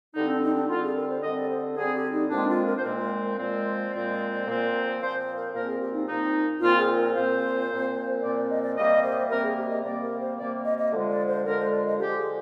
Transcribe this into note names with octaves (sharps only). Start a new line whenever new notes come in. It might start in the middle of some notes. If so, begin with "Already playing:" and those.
D3 G3 C4 D#4
D4
D#4
D4
D3 G3 C4 F4
G#4
A#4
C5
D3 G3 C4 D#5
D5
C5
D3 G3 C4 G#4
G4
D#4
A#2 F3 G#3 C4 D4
F4
A#4
C5
A#2 F3 G#3 C4 A#4
A#4
A#2 F3 G#3 C4 D5
A#2 F3 G#3 C4
A#2 F3 C4
A#2 F3 C4 C5
C5
A#4
A#2 F3 C4 A#4
G#4
G4
D#4
A#2 F3 C4 D#4
A#2 F3 C4 F4
G#4
A#4
A#2 F3 C4 C5
A#2 F3 C4
A#2 F3 C4 D5
D5
D#5
D5
C3 G3 A#3 D#5
C5
C3 G3 A#3 A#4
G#4
G4
D#5
C3 G3 A#3 D5
A#4
C5
C3 G3 A#3 D5
D#5
D#5
D3 F3 G#3
D5
C5
D3 F3 G#3 A#4
C5
D5
D#5
D3 F3 G#3 G4
G#4